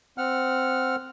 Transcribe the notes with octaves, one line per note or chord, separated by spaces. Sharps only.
C4 F#5 F6